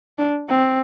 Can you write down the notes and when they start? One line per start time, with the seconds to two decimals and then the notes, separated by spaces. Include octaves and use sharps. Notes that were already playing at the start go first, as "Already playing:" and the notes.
0.18 D4
0.49 C4